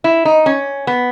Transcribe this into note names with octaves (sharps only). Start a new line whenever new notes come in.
E4
D#4
C#4
B3